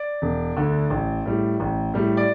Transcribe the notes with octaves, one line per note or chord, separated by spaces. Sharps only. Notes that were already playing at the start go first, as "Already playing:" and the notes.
Already playing: D5
E1
D2 D3
A1
A2 G3
A1
A2 G3
D5